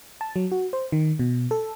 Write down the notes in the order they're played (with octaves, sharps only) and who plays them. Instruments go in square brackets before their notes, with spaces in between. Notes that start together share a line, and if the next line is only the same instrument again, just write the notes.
[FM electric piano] A5
F#3
F#4
C5
D#3
B2
A4